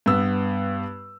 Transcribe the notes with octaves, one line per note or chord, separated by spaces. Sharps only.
G2 B3 E6